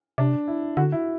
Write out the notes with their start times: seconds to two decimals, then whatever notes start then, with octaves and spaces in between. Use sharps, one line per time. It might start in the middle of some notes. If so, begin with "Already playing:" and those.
0.18 C3 D4
0.48 E4
0.77 D3 F#4
0.92 E4